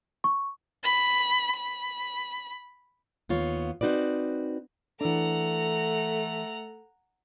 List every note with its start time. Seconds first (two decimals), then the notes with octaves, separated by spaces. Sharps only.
0.24 C#6
0.83 B5
1.56 B5
3.29 D#2 B3 F4 C#5
3.81 C4 D#4 F#4 B4 D5
5.01 E3 A3 D4 A4 F#5 A#5